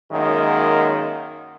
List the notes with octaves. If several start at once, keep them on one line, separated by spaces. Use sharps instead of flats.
F#2 D#3 G#3 A#3